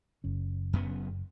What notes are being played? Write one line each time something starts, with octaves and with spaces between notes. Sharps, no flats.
F#1 C#4
F#2 C#3 B3